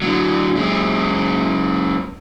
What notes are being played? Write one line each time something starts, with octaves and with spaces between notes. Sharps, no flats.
D3 F#3
F#2 G#3